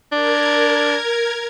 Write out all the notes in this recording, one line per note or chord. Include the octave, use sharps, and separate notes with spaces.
D4 A#4 G#6